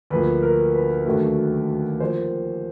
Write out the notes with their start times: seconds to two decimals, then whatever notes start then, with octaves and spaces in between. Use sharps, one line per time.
0.10 D2 D3 F3 A#3 B4
0.42 A#4
0.74 B4
1.06 D#2 D3 F#3 A3
2.00 F3 A#3 C5